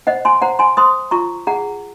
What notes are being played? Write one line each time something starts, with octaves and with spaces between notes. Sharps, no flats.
C5 D#5 F#5
G#5 C6
C5 F#5 A#5
G#5 C6
C5 C6 D#6
F4 A#5 C#6
G#4 F#5 A#5